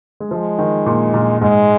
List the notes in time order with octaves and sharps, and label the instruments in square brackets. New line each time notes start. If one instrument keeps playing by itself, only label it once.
[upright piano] G#3
[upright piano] F3 [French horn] G#3
[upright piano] D#3
A#2
A#2
[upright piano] G#2 [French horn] G#3